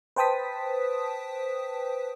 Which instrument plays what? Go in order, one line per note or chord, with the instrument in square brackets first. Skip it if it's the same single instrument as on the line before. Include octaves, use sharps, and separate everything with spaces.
[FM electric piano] B4 C5 G5 A5 D#6 B6